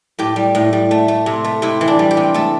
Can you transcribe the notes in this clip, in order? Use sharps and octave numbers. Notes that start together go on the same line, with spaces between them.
A2 G4
G3
A2
G3
A3
A3
C3
A3
C3 E4
E3
D4
G3
G4
C3
A3 A4